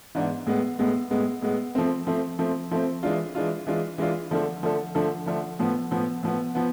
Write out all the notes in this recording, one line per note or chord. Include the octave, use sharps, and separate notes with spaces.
G#2 E3 B3 D4
A2 G#3 B3
A2 G#3 B3
A2 G#3 B3
A2 G#3 B3
F3 A3 C4
F3 A3 C4
F3 A3 C4
F3 A3 C4
E3 G#3 D4 F4
E3 G#3 D4 F4
E3 G#3 D4 F4
E3 G#3 D4 F4
D3 F3 A3 D4 A4
D3 F3 A3 D4 A4
D3 F3 A3 D4 A4
D3 F3 A3 D4 A4
A2 F3 B3
A2 F3 B3
A2 F3 B3
F3 B3